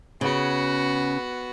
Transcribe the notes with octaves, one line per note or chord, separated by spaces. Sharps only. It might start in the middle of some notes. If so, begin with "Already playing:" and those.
C#3 B3 F#4